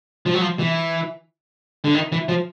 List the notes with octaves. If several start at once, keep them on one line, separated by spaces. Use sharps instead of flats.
F3
F#3
F3
E3
D3
D#3
E3
F3